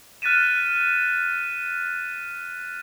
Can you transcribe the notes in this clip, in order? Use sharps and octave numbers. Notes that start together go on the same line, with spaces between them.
F6 F#6 A6 B6 D#7 E7